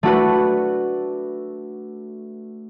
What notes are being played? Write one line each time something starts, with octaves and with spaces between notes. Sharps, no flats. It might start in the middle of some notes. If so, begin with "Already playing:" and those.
A3 D4 F#4 B4